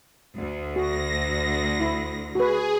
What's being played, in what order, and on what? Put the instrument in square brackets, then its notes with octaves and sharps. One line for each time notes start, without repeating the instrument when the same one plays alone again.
[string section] D2
[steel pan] F#4 [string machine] A#6
[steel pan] E4
[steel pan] F#4 B4 [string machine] G#4